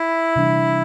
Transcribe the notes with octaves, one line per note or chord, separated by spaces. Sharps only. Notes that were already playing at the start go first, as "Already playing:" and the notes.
Already playing: E4
C3 E3 G3 D4